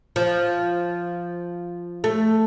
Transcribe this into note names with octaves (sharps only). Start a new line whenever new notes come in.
F3
A3